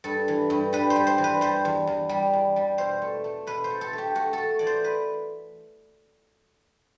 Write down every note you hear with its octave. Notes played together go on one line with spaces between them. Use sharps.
G2 A4
E3
G2
G3 B4
C5
G3
C5
E3
B4
G3 C5
E2
E2
G3
E2
G3
B2 C5
A3
A3
B2 B4
C5
A3
A4
A3
G4
A3 F#4
A3 A4
E3 D5
C5
B4